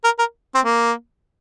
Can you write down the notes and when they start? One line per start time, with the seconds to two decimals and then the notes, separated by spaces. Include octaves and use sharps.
0.04 A#4
0.19 A#4
0.55 C4
0.65 A#3